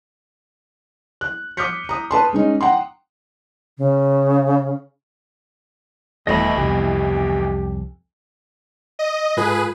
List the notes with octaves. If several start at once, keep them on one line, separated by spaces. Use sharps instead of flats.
F#6
D6 D#6 F6 G6 B6 C#7
A#5 D#6
B4 A5 C6
G#3 C#4 D#4
F#5 G5 A#5 C6
C#3
D#1 D2 B2 E3 A3 D#5 B5
C2 F2 G4
D#5
G#2 F4 G#4 A4 B4